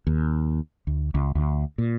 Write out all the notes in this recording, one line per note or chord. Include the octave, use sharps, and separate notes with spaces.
D#2
D2
C#2
D2
A#2